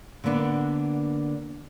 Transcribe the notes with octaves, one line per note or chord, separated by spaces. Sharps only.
D3 A#3 B3 D4